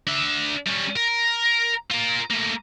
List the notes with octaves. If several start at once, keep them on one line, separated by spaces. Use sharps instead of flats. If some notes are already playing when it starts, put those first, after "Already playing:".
D4 E5
G3 C#4
A#4
F4 A#4
A3 A#3